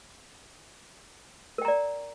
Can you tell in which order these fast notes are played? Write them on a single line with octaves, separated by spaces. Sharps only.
A#4 G5 A#5 D5